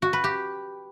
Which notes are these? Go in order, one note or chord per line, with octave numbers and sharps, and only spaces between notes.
F#4
B4
G4